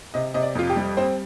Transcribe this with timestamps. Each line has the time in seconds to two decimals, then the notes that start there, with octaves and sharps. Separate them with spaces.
0.14 C3 D#5
0.34 C3 D#5
0.42 D5
0.55 F2 F4
0.69 G4
0.76 G3
0.97 C4 C5